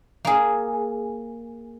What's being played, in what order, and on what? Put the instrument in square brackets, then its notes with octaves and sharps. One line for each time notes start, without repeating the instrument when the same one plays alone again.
[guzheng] A#3 G#4